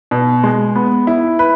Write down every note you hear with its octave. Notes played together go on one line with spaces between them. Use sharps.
B2
G#3
B3
E4
B4